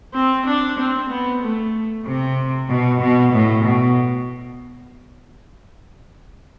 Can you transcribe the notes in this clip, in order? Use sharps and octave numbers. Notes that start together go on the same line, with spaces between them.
C4
D4
C4
B3
A3
C3
B2
B2
A2
B2